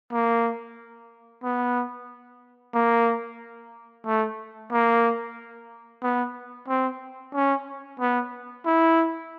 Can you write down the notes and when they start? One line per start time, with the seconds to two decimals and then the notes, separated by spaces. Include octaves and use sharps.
0.12 A#3
1.43 B3
2.74 A#3
4.06 A3
4.72 A#3
6.03 B3
6.68 C4
7.34 C#4
8.00 B3
8.66 E4